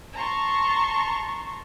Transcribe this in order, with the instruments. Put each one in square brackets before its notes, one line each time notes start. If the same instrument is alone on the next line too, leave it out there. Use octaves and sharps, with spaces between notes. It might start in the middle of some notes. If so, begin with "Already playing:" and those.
[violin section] A5 A#5 C6 C#6